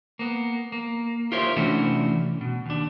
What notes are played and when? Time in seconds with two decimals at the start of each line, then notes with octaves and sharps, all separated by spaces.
0.19 A#3 B3
0.72 A#3
1.32 F4 G4 A#4 C5 C#5 E5
1.57 C3 E3 A3 C#4 D4 F#4
2.41 B2
2.66 D#2 D4